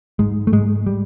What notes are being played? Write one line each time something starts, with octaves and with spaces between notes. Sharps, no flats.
G#2 G#3
A3
G#2 G#3
G3